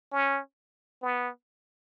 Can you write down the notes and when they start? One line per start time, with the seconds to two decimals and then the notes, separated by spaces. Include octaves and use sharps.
0.12 C#4
1.02 B3